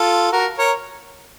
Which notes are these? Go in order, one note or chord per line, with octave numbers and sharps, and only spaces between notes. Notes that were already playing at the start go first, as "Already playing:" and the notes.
Already playing: F4 A4
F#4 A#4
A#4 C#5